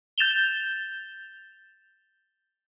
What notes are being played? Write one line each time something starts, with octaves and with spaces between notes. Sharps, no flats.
G6 A6 E7 F7 G7